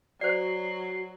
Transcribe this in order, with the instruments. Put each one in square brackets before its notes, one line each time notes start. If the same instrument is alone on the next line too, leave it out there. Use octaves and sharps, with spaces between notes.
[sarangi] F#3 [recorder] F#4 [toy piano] C5 D5 [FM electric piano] C7